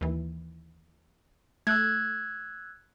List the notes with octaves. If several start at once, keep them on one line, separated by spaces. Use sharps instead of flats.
D#2 E3
A3 E6 F#6 G#6